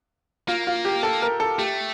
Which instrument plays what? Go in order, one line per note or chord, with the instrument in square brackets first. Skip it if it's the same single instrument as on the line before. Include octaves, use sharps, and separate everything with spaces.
[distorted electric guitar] A#3 [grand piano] F4
[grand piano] F4
G4
A4
A#4
A4
[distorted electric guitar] A3 [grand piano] G4